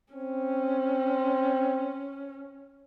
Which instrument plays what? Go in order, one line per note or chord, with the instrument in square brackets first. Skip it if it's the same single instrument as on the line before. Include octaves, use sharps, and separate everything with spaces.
[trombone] C4 [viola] C#4